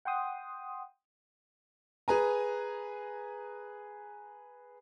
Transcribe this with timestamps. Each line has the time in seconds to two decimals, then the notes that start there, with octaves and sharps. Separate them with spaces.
0.05 F#5 G5 C6 D#6
2.08 G#4 B4 G#5 A#5